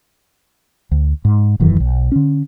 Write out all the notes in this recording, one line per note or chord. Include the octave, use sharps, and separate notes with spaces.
D2
G#2
E1 F#2 D#3 E3
B1
D3 C#4